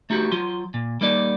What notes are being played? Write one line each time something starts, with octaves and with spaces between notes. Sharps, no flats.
A3 D#4 F#4 G4
F#3 F4 C6
A#2
G3 A#3 D#4 D5